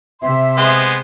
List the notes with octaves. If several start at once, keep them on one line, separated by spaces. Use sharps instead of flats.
C3 E5 C6
G#3 B3 C5